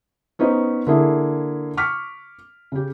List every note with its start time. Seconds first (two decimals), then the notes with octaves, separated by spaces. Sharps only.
0.39 B3 C#4 D#4 B4 C5
0.87 D3 A#3 E4 G#4
1.77 C#6 D6 F6 B6
2.72 C#3 G4